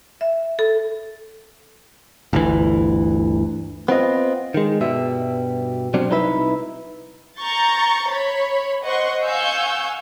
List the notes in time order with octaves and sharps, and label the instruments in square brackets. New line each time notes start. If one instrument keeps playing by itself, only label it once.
[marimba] E5
A4
[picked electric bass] G1 D2 E3
[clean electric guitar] B3 C4 F4 D#5
D#3 G#3
G2 B2 G3 E5
B2 F#3 G3 C4 D4
C2 D#4 E4 B4 E5
[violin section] A#5 C#6 G6 A6
C#5 B5
C5 D#5 F#5 C6 C#6
F5 F#5 G#5 C#6 E6 G6